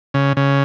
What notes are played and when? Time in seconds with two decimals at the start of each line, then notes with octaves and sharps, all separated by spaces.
0.14 C#3
0.37 C#3